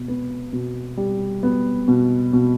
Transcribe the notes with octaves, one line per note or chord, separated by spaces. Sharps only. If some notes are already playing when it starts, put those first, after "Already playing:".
Already playing: B2
B3
B2
G3
B3
B2
B2